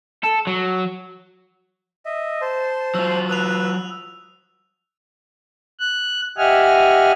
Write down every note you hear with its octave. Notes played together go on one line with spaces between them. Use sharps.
A4
F#3
D#5 E5
C5 A5 C6
F#3 F4 E6
B4 D#6 E6 F#6 F7
F#6
G4 D#5 E5 F#5 G#5 F6